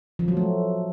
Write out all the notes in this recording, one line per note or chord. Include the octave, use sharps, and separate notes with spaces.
F3
F#3
A3